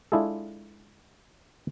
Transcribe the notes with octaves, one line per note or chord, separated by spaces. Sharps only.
G#3 D4 E4 F4 G#4 A4